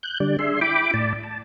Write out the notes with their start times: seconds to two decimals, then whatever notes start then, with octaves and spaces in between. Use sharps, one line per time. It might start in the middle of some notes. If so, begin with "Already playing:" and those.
0.03 F#6 G6
0.20 D3 G3 D5
0.39 D4 G#4 E5 C6
0.61 E4 G5 B5 D6
0.94 A2 D5 A5
1.23 A5